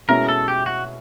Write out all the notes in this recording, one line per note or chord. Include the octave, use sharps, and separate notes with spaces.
B2 G#3 C#4 E4 A#4
A4
G4
F#4